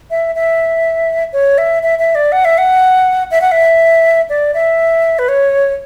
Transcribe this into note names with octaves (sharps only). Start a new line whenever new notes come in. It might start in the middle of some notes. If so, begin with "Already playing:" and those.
E5
E5
C#5
E5
E5
E5
D5
F#5
E5
F#5
E5
F#5
E5
D5
E5
B4
C#5